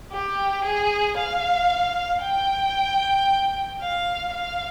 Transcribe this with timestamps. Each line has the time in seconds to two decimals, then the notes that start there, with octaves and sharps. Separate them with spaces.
0.12 G4
0.64 G#4
1.17 F5
2.23 G5
3.81 F5
4.34 F5